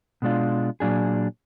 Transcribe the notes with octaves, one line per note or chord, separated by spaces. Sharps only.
B2 G#3 D4 F4
A#2 F#3 D4 G#4